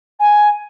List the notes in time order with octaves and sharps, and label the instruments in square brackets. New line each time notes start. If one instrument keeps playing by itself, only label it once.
[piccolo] G#5